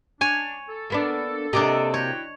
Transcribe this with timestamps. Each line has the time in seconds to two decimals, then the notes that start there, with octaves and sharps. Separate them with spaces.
0.21 D4 C#5 G#5
0.69 A4
0.90 A#3 B3 D4
1.53 C3 A#3 D4 D5 D#5
1.94 E4 F#4 C#5 G5